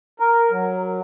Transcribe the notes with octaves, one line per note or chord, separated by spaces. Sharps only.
A#4
F#3